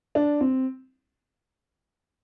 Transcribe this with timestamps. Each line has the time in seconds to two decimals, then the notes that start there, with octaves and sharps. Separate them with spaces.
0.15 D4
0.41 C4